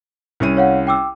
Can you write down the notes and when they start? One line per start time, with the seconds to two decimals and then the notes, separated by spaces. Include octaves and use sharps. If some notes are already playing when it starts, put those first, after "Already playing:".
0.40 C2 C#4 D#7
0.57 C#5 F5 F#5
0.87 G5 D6 E6